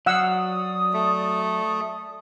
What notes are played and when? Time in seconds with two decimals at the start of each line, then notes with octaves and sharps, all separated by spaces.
0.06 F#3 D5 F5 F#5 D#6 E6
0.93 A3